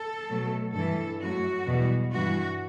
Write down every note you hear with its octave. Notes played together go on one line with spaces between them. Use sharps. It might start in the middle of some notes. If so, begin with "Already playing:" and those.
Already playing: A4
B2 F#3 A3
G2 E3 A3 A4
F#2 F#3 A3 F#4
E2 B2 G3
G2 E3 G3 F#4